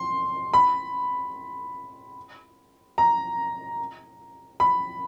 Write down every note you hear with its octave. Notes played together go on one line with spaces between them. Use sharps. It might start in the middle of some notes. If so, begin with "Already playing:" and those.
Already playing: C6
B5
A#5
B5